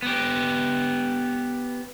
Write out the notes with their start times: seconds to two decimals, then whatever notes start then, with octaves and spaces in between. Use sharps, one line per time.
0.02 B3 G4